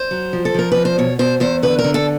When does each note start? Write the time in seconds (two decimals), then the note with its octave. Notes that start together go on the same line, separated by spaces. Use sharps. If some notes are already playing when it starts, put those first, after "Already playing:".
Already playing: C5
0.11 F#3
0.33 F3
0.45 A4
0.54 F3 A#4
0.72 F2 B4
0.85 C5
0.98 B2 C#5
1.19 B2 C5
1.40 E2 C5
1.63 D3 B4
1.79 A#4
1.84 D3
1.94 A4